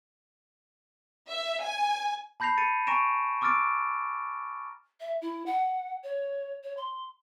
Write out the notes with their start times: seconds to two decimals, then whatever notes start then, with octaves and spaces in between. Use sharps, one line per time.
1.28 E5
1.61 G#5
2.40 A5 B5 G6 A#6 C7 F7
2.57 A6 C#7 D#7
2.87 G#5 A#5 C#6 A#6 D7 E7
3.41 C#6 D6 E6 F6 A6 D7
5.00 E5
5.22 E4
5.46 F#5
6.03 C#5
6.64 C#5
6.77 C6